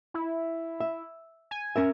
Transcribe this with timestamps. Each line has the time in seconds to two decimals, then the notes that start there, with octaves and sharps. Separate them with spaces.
0.14 E4
0.80 E5
1.51 G#5
1.76 C#4 A#4 E5